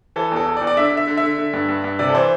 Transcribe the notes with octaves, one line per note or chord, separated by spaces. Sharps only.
E3 A4
E2 A4
E2
D5
E2
D5
D3 E5
D3
E5
D3
E5
D3
D3
G2
G2
G2
C3 D5
A4
E3 C5